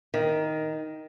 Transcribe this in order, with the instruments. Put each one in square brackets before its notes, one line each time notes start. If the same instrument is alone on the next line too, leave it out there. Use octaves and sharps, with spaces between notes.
[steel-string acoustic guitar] D#3